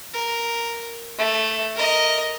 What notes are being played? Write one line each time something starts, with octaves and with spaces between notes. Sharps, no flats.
A#4
A3
A#4 D#5